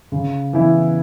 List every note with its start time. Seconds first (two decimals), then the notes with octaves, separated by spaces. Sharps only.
0.12 C#3
0.53 E3 B3 E4